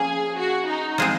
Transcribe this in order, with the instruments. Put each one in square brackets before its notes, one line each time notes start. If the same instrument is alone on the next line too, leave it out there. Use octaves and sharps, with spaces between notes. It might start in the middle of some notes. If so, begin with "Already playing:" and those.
Already playing: [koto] F3 A#3 C#4 [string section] G#4
[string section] F#4
D#4
[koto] F3 G#3 C4